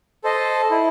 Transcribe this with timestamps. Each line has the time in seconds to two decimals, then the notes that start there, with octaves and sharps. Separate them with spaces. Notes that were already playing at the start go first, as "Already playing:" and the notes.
0.24 A4 C5 D#5
0.71 E4